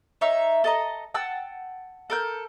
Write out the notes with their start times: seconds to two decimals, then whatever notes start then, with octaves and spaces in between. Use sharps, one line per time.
0.21 D#4 C#5 E5
0.64 A4 D#5 A#5
1.14 F#5 G5 A5 E6
2.10 A4 A#4 G6